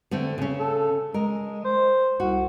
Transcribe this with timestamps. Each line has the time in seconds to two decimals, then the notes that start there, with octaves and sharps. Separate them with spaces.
0.11 D3 A3 C4
0.38 C#3 C#4
0.60 A4
1.14 G#3 A#4
1.65 C5
2.20 C2 F#4